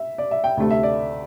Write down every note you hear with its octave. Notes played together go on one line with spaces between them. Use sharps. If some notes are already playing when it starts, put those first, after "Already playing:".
Already playing: E5
D5
E5
G5
D2 C3 A3
E5
D5